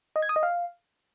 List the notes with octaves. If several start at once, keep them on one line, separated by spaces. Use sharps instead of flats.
D#5
G#6
D#6
D#5
F5